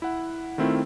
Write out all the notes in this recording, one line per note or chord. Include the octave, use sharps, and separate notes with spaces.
E4 F#5
D#3 A3 C4 E4 F4